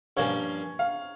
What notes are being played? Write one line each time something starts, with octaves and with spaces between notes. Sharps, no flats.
G2 F3 A#3 C#4 C#5
F5